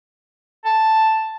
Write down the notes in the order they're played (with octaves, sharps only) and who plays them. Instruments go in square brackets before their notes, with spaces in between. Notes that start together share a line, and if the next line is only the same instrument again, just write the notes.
[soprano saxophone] A5